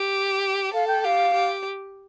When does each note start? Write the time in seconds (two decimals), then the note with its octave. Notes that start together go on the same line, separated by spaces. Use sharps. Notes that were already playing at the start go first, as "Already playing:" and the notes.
Already playing: G4
0.74 A4 F5
0.88 G5
1.01 G5
1.04 G4 F5
1.34 G4